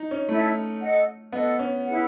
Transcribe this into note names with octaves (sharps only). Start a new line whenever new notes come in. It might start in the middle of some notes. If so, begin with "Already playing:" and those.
Already playing: D#4
C#4
A3 E4 A4 C#5 E5
A4 D#5 F#5
B3 A4 D#5 F#5
C#4
E4 G#4 B4 F#5